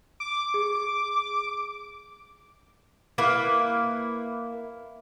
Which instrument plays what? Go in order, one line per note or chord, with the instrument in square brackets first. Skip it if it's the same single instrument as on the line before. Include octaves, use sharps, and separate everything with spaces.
[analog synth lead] D6
[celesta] G#4
[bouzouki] A#3 E4 B4